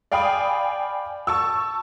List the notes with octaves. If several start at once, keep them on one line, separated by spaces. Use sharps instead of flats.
D5 F5 G5 G#5 B5 D#6
A5 C#6 E6